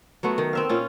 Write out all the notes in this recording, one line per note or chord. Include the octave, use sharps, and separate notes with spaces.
F#3 A3 B3 F#4
D#3
C4 E5 F5
A#2 C#4 F4